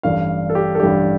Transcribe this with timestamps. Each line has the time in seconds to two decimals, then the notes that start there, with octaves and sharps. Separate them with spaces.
0.03 A1 G2 G3 D4 F5
0.50 A4
0.55 G4
0.75 A4
0.80 A1 G2 G3 D4 G4